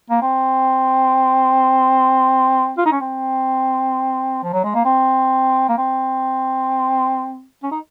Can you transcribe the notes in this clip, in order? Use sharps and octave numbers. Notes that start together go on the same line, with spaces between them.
A#3
C4
F4
D#4
C#4
C4
F3
F#3
G#3
A#3
C4
A#3
C4
C#4
D#4